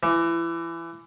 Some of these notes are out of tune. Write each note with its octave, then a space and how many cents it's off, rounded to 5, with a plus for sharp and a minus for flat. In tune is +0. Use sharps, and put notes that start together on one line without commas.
E3 +25